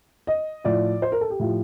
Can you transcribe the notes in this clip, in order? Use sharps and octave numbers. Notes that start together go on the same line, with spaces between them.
D#5
A2 F3 D5
C5
A#4
A4
G4
A2 F3